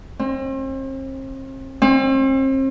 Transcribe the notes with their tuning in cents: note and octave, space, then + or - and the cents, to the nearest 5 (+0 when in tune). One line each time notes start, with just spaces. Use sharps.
C4 +40
C4 +40